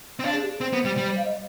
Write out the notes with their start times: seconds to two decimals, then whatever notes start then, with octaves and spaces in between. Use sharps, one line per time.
0.20 C4
0.24 D4 F5
0.33 G#4
0.42 G4
0.51 G#4
0.60 C4 C5
0.73 B3
0.85 G3
0.97 G3
1.17 F5
1.25 D#5